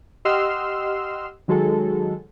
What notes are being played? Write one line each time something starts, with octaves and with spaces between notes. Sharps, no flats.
G4 D#5 F#5 C6 E6 F6
D#3 F#3 G#3 F#4 A4